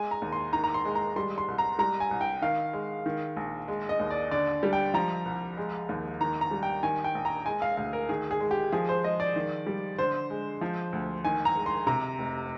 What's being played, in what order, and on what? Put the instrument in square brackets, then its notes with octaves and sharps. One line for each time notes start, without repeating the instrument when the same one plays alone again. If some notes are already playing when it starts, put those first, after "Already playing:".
Already playing: [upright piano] G#3 G#5
A#5
D#2
C6
D#3 A#5
A#5
C6
G#3
A#5
G3 C6
C6
C2
A#5
G3 A#5
G#5
C2
G5
D#3 F5
G#3
D#3
A#1
G#3
D#5
D#2
D5
D3 D5
G3
G5
F3 A#5
C2
G#3
D#2
D#3 A#5
A#5
G3
G5
D#3 G#5
G5
A#1
A#5
G#3 G#5
F5
D2 F5
A#4
D#3 G#4
G#4
G#3
G4
F3 G#4
C5
G#3 D#5
D5
D#3
G3
D3 C5
G#3
F3
D2
D#3 G#5
A#5
G#3
C6
C3 A#5
F1